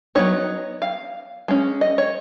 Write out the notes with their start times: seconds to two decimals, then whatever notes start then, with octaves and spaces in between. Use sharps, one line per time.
0.15 F#3 B3 D#4 C#5
0.82 F5
1.48 G#3 C#4
1.81 D#5
1.98 C#5